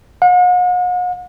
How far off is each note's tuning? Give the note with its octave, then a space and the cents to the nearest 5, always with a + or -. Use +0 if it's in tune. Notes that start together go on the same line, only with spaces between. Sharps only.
F#5 -45